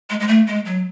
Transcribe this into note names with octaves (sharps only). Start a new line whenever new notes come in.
G#3
G#3
A3
G#3
F#3